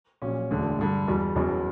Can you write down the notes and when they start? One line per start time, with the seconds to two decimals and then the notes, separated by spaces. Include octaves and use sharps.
0.22 A#1 A#2 F#3 C#4
0.51 E1 D2 D3
0.79 G2 D3 G3
1.08 E2 B2 G3
1.36 F#1 E2 B2 F#3 B3